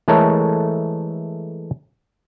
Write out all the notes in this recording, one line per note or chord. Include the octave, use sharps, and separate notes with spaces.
E3 G#3 A3 A4 A#4 C#5